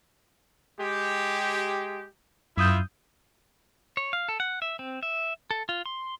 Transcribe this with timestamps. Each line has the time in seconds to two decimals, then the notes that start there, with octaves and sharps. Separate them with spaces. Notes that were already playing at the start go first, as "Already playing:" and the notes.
0.79 G#3 G4
2.57 F#2 E4 F4 E5 D#6 G6
3.97 C#5
4.13 F5
4.29 A4
4.40 F#5
4.62 E5
4.79 C4
5.03 E5
5.51 A4
5.69 F4
5.86 C6